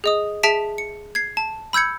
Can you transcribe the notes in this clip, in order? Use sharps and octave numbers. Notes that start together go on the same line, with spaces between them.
G#4 D#5 D#6
G#4 E5 A5 B6 D7
C#7
G#6 C7
A5
B5 E6 G6 G#6 C#7